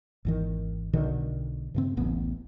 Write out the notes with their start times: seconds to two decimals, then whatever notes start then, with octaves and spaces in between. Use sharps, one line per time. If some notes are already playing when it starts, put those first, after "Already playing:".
0.25 G#1 E2 D#3
0.93 B1 B2 D3 D#3
1.74 G2 C#3 C4
1.97 D1 A1 B3